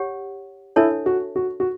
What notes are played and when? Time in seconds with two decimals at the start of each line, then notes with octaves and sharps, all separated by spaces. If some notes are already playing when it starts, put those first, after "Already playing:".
Already playing: G4 C#5 F#5
0.76 D4 E4 A4 C#5 E5 A5
1.06 F#4
1.36 F#4
1.60 F#4